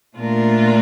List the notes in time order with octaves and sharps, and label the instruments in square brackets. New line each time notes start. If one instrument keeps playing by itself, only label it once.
[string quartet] A#2 A3 D4 F4 A#4